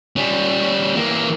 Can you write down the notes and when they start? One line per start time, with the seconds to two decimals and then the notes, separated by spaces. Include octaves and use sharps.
0.16 G3 C#4
0.96 E3 A#3